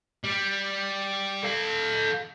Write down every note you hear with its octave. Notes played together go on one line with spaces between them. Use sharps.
G3
A4 F5